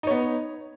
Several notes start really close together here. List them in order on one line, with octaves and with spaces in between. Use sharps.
D#4 C#5 B3